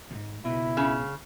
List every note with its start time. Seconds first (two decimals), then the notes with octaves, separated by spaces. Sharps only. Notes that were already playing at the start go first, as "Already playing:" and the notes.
0.11 D2 G#2
0.45 C#2 B2 E4
0.77 C#3